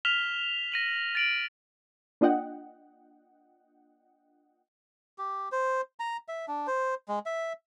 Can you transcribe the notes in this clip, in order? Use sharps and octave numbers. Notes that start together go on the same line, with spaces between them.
F6 B6 E7 F7 G7
A#6 D#7 F#7
A6 D7 F#7
A#3 D4 F4 D#5 F#5 G5
G4
C5
A#5
E5
D4
C5
G#3
E5